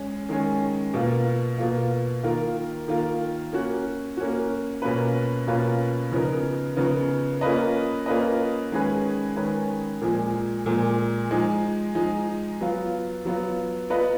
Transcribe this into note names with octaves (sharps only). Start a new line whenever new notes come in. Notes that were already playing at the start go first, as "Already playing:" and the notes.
Already playing: G#3 C#4
D#3 G#3 C#4
B2 A#3 F4
B2 A#3 F4
D#3 A#3 F4 A#4
D#3 A#3 F4 A#4
A#3 C#4 F#4
A#3 C#4 F#4
B2 A#3 C#4 F4 B4
B2 A#3 C#4 F4 B4
C#3 F3 B3 D#4 A#4
C#3 F3 B3 D#4 A#4
A#3 C#4 F4 B4 D#5
A#3 C#4 F4 B4 D#5
D#3 G#3 C#4 G#4 B4
D#3 G#3 C#4 G#4 B4
A#2 F3 G#3
A#2 F3 G#3
F3 G#3 D#4
F3 G#3 D#4
F#3 B3 F4
F#3 B3 F4
B3 F4 B4 D#5